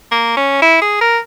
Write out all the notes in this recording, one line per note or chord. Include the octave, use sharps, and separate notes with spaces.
A#3
C#4
E4
G#4
A#4